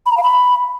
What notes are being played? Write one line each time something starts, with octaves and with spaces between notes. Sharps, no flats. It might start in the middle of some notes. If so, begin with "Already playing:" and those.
B5
A#5
F5
B5